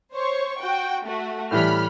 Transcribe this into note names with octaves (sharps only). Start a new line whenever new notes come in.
C5 C#5 C#6
F#4 G5
A3 F#4
A2 E3 G3 B5 F6